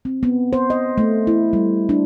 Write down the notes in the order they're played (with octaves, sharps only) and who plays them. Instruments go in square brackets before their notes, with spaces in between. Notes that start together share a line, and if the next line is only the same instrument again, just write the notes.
[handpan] C4
B3
C5
D#5
A3
E4
G3
D4